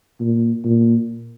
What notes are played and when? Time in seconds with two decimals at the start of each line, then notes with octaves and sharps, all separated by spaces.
0.20 A#2
0.64 A#2